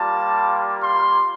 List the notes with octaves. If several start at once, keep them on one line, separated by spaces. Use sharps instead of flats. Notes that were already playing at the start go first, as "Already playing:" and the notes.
Already playing: G3 A#3 F4 A5
C6